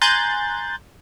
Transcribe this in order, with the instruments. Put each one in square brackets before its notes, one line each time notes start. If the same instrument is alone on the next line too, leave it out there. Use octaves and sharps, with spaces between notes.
[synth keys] G#5 A#5 C6 F#6 G6 A6